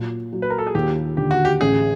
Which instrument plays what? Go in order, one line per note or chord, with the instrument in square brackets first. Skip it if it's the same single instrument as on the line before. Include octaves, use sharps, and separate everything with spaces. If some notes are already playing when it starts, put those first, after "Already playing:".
Already playing: [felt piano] A#2 F#3
F#3
[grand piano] B4
A#4
A4
G#4
[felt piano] D#2 [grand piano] G4
[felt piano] D3 [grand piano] G4
[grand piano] F#4
G4
[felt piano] A1 [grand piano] G#4